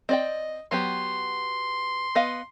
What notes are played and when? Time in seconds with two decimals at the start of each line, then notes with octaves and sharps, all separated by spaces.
0.09 C4 D5 D#5 G5
0.71 F#3 B3 G4 C6
2.15 B3 D#5 F5